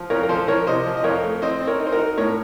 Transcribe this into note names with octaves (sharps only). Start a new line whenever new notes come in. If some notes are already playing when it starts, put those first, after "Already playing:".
Already playing: F3
F2 A#4 C#5
A#4
F3 A4 C5
F3 A#4 C#5
C3 C5 D#5
F3
D#5
F2 A#4 C#5
A3
C4 C5 D#5
C4
A#4 C#5
D#4
C5
F#4 A#4
D#4
A2 A#4 C#5